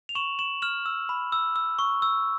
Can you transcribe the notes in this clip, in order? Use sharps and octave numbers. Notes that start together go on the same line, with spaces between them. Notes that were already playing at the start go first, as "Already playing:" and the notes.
F7
C#6 E7 F#7
C#6 E7 F#7
F6 E7 F#7
E6
B5
E6
E6
C#6
E6